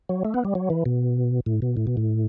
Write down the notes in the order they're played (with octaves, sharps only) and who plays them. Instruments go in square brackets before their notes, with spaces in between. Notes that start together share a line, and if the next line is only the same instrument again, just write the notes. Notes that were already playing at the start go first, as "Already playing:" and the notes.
[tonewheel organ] F#3
A3
B3
G3
F#3
E3
B2
A2
B2
A2
B2
A2